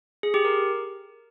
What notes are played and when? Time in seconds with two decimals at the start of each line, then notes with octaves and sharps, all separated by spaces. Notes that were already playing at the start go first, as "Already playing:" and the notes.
0.23 G#4
0.34 G4
0.45 A#4